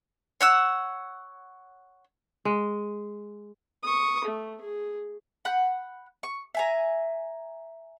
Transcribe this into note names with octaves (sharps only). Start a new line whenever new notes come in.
C#5 F#5 E6
G#3
C#6 D#6
A3
G#4
F#5 B5 F#6 G6
C#6
E5 G#5 A#5